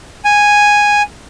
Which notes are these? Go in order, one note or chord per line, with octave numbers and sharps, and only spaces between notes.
G#5